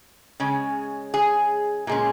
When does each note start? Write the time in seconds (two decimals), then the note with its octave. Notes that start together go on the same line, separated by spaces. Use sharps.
0.40 C#3 G#3 C#4
1.14 G#4
1.87 A#2 G#3 C#4